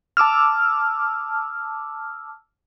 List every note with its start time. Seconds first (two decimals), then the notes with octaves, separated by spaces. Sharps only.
0.17 A5 D6 E6 F6